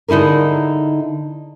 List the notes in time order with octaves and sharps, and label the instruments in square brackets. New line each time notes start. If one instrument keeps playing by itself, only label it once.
[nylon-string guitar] D3 D#4 E4 G#4 A#4